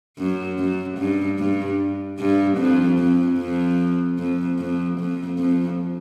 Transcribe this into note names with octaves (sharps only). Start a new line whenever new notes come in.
F#2
F#2
G2
G2
G2
F2
F2
F2
F2
F2
F2
F2